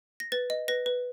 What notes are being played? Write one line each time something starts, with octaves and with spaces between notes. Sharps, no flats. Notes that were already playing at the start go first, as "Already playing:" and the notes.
A#6
B4 A6
D#5
B4 A#6
B4